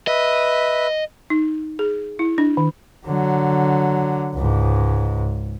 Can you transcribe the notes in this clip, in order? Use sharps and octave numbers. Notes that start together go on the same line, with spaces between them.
B4 D#5 E5
D#4
G#4
E4
D4
D#3
D3 F#3
C#2 G#2